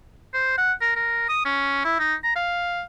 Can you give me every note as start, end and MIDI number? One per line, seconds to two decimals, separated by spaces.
0.34 0.57 72
0.58 0.73 78
0.81 0.92 70
0.96 1.27 70
1.29 1.42 87
1.45 1.83 61
1.85 1.99 64
1.99 2.14 63
2.24 2.36 82
2.36 2.83 77